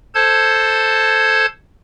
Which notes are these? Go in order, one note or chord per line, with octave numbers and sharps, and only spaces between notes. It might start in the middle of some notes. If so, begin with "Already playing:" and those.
A4 C5 A5 G#6